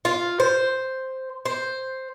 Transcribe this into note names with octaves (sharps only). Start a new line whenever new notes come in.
F4
C5
C5